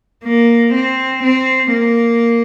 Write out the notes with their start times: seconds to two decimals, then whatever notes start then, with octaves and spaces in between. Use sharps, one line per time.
0.25 A#3
0.74 C4
1.23 C4
1.73 A#3